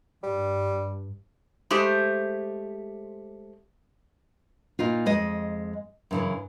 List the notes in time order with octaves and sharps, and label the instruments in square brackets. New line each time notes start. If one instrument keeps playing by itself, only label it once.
[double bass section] G2 [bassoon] G3
[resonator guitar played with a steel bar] G#3 A3 G4 C5
[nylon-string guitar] A#2 D#4 F4
F2 G#3 D#5
F#2 C#3 E3